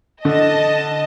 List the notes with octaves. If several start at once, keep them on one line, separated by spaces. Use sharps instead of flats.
D3 D#5 A5